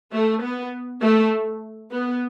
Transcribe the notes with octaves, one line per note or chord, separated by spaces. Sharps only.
A3
B3
A3
B3